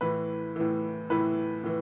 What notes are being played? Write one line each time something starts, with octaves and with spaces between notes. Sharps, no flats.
A2 E3 B4
A2 E3
A2 E3 B4
A2 E3